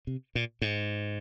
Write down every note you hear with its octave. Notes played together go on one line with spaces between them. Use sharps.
C3
A#2
G#2